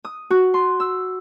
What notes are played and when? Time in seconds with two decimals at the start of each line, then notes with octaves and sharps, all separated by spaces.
0.05 D#6
0.30 F#4
0.54 C6
0.80 E6